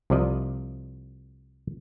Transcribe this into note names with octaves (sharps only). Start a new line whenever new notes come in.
C2 C3 F3 D5 D#5